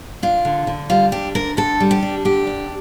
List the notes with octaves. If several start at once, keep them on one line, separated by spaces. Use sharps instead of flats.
D4 F4
D3
D3
G3 F4
D4 G4
D3 A#4
D3 A4
G3
G4
D4
D3 G4
D4